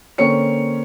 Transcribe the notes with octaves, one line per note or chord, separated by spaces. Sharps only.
D3 A#3 C4 C#4 C#5 C#7